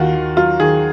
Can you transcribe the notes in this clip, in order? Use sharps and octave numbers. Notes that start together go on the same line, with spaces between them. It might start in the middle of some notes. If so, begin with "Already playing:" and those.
Already playing: D#2 D#3 F4 F#4
D#2
F#3 F4
D#3 G#4